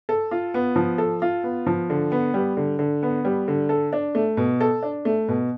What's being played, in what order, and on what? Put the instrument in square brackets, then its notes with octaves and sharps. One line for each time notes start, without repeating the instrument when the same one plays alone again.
[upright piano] A4
F4
B3
F3
A4
F4
B3
F3
D3
B3
G3
D3
D3
B3
G3
D3
A4
D4
A3
B2
A4
D4
A3
B2